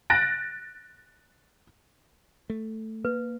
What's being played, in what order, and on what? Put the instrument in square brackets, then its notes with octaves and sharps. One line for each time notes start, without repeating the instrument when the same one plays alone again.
[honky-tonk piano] F#6 A6 A#6 D7
[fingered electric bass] A3
[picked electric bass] A#3 [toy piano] B4